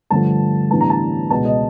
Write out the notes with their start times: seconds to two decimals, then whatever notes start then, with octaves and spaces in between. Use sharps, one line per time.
0.10 G2 D3 F3 A3 A5
0.70 A2 E3 G3 B3 D4 A5
0.81 A#5
0.90 A5
1.30 C#2 B2 G#3 B3 A5
1.45 D#5